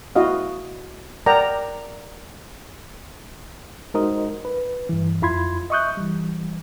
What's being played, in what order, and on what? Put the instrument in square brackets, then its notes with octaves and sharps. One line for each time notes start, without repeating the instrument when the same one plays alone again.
[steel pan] E4 F#4 D#5 F5
A#4 D5 F#5 G5 A#5
[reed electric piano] G#3 D#4 F#4 A#4 C5 D#5
B4
G2 E3
F2 E4 F4 B5 C6 G#6
D#5 E5 C#6 D#6 F#6 G6
E3 G3